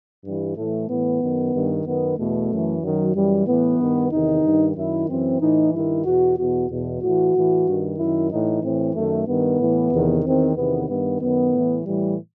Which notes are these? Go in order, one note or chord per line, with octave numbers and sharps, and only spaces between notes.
G2 E3 G3
A2 E3 A3
A2 E3 B3
F#2 D#3
G2 D#3
F#2 D#3 B3
E2 B2 A3
F#2 E3
F#2 D#3 F#3
F#2 E3 G3
A2 E3 B3
G2 D#3
E2 C3 D#3 D#4
G2 D#3
F#2 D#3 E4
F#2 E3 C4
A2 E3 D#4
G2 D#3 E4
E2 B2 F#4
E2 B2 F#4
E2 B2
A2 E3 F#4
A2 E3
G2 D#3
F#2 D#3 E4
A2 E3 D#4
A2 E3 C4
F#2 D#3 A3
G2 D#3 B3
A2 E3
E2 C3 D#3
E2 D#3 C4
E2 C3 D#3 B3
G2 D#3 B3
F#2 D#3 B3
A2 E3
A2 E3 G3